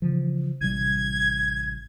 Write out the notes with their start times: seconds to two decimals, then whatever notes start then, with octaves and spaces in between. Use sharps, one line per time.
0.02 C#3 E3 F3
0.61 A1 C3 G3 G#6